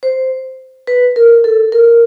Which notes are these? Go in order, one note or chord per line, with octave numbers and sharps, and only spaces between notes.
C5
B4
A#4
A4
A#4